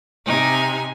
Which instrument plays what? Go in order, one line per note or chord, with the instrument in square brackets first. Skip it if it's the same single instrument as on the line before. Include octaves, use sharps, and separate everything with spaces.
[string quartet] C3 D#4 G#5